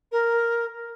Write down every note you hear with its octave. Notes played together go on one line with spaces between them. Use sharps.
A#4